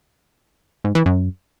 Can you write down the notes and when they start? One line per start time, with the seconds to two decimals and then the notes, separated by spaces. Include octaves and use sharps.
0.84 G#2
0.95 E3
1.06 F#2